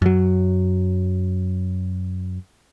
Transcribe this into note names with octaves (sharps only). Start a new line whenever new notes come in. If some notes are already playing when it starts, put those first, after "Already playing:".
F#2 F#3